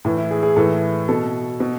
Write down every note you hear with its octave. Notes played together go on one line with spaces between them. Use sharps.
A2 E3
E4
G#4
G#4
A2 E3 A4
B2 A4
B2